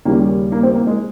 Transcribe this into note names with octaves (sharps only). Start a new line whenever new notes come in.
D#2 C#3 G3 A#3
A#3
C4
A#3
G#3